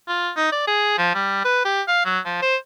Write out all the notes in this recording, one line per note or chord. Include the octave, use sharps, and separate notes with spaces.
F4
D#4
D5
G#4
F3
G3
B4
G4
F5
F#3
F3
C5